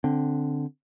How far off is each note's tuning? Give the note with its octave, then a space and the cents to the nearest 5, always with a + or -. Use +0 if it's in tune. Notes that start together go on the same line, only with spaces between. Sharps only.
D3 +0 C4 +0